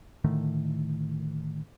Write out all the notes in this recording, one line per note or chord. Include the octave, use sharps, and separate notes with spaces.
A2 D3 D#3 A3